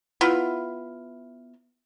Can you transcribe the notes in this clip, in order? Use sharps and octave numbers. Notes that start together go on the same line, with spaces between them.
B3 E4 F4